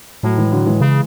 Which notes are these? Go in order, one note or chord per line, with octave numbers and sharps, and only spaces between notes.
A2 F#3 A3
E3 G#3
D3 F#3
E3 G#3
C#3